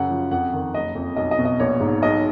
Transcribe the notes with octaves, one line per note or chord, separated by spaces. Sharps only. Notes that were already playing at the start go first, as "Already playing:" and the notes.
Already playing: F#2 C#3 F#5
F3
F2 F#5
D#3
F#1 D#5
F2
B1 D#5
D#5
B2
D#5
A#1 C#5
G#2
B1 D#5